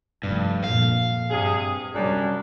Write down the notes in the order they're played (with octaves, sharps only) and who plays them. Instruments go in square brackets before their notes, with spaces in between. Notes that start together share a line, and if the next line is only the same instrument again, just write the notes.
[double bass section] F1 [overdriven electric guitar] G2
[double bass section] F2 A#2 [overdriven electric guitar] F5
[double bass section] G2 [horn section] C3 D4 G#4
[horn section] F#2 C#4 D4 [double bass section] C3 F#3 G3